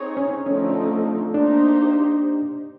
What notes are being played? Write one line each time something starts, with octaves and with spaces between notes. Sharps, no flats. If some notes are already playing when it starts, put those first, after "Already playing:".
Already playing: C4 D#4 G#4 C#5
C#4
D3 F3 A3 C4 C#4 D#4
A#3 D4 D#4 G4 C5